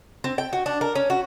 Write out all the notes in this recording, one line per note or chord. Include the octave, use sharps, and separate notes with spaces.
C4
G5
F#4
D4
A#4
C#4
F#4